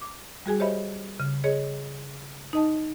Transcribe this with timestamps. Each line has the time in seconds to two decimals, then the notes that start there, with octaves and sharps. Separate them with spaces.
0.02 D6
0.46 G3 F#4 G#4 G#5
0.60 G4 C5 C#5 D#5 E5 B5
1.20 C#3
1.44 G#4 C#5 D#5
2.53 D#4 D#5 A5